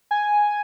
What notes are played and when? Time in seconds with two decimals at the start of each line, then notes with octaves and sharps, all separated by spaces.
0.11 G#5